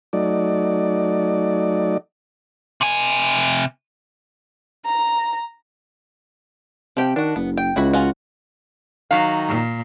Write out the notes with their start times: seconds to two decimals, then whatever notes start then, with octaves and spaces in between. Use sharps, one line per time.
0.13 F#3 A3 D#4 D5
2.81 C3 G#5
4.85 A#5
6.97 C3 F3 G4 G5
7.16 D#3 D4 F#4
7.36 F#1 B3
7.57 G5
7.76 C#2 E4 F#4 B5
7.93 C#4 F4 F#4
9.11 D#3 F#3 F5
9.48 A#2